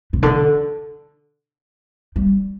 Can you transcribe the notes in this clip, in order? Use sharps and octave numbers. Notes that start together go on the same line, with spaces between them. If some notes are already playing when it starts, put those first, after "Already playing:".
B2
D3
G3